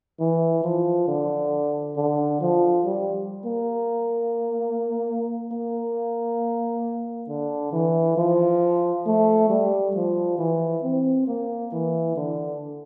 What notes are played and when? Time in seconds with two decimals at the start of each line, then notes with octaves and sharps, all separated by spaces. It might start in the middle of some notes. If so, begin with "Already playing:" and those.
0.20 E3
0.64 F3
1.08 D3
1.97 D3
2.41 F3
2.86 G3
3.45 A#3
5.52 A#3
7.28 D3
7.73 E3
8.17 F3
9.06 A3
9.50 G3
9.95 F3
10.39 E3
10.84 C4
11.28 A#3
11.73 E3
12.17 D3